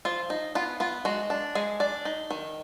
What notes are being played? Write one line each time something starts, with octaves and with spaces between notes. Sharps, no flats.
F3 F4
D#4
B3 F4
B3 F4
G#3 F#4
D4
G#3 G#4
D4 D5
D#4
D#3